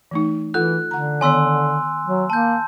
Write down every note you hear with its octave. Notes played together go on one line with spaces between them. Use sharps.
E3 A3 D#4
E3 F4 A4 F#5 F#6
D3 F#5 A#5
D#3 B3 C#5 G#5 C6 E6
F#3
A#3 A5 G6